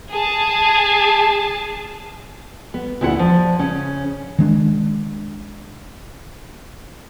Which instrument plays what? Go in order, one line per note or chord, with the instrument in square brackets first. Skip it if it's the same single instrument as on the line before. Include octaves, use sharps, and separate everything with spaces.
[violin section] G#4 A5
[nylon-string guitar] B3
D2 A#2 E4 G#4 F#5
F3
C#3 C#4
[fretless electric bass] D#3 G#3 D4